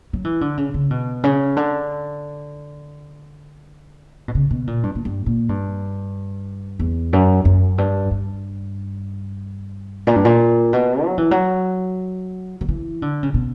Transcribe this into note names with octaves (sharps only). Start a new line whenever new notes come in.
F#3
E3
D3
C#3
C#3
B2
C#3
D3
B2
C#3
B2
A#2
G2
A#2
G2
A#2
G2
E2
F#2
F#2
G2
G2
A#2
G2
A#2
B2
F#3
E3
F#3
F#3
E3
D3
C#3
B2